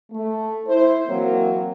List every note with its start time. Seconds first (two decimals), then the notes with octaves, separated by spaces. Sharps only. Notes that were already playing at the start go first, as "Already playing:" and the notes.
0.12 A3
0.67 E4 C5
1.08 E3 F#3 A#3 C4 A#4 C#5